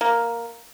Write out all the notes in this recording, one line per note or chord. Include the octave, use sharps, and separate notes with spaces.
A#3